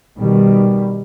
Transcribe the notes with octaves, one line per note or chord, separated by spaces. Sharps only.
B2 D#3 G3